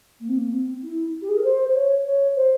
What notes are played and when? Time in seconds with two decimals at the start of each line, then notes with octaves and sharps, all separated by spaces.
0.20 A#3
0.29 C4
0.38 A#3
0.51 C4
0.82 E4
1.22 G4
1.29 G#4
1.37 A#4
1.44 C5
1.68 C5
1.75 C#5
2.05 C#5
2.36 C5